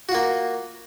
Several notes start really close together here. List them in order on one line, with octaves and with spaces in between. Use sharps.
F#4 F4 A#3